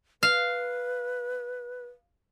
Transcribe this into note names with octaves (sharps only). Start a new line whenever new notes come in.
B4 F5